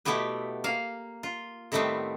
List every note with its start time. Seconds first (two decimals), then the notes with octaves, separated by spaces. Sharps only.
0.05 B2 A3 B3 E4 G4 B4
0.64 A#3 F5
1.23 F4
1.72 A2 D#3 G3 A3 B3 C4